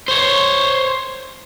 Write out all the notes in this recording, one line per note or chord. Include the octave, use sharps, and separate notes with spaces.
C5 C#5